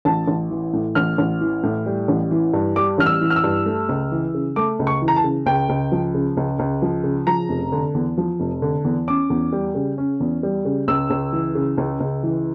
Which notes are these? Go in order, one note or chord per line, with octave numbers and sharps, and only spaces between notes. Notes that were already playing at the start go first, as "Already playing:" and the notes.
A1 A5
A1
E3
A2
A1 F6
A1
E3
A2
G3
A1
E3
G2
G3 D6
A1 F6
E6
E3
F6
E6
G2
A3
C#2
E3
C#3
A3 D6
C#2
C#6
E3
A#5
A5
C#3
C#2 G5
C#2
F3
C#3
C#2
C#2
F3
C#3
F3 A#5
F1
D3
E2
F3
F1
D3
E2
C#4 D6
E2
G3
C#3
C#4
E2
G3
C#3
C#2 E6
C#2
E3
C#3
C#2
C#2
E3